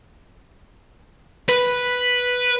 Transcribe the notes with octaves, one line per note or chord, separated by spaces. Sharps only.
B4